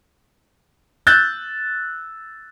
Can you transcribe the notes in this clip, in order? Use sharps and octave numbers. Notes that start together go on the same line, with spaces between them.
E6 F#6 G6 A6